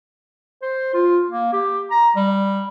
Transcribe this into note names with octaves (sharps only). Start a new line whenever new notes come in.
C5
F4
A#3
G4
A#5
G3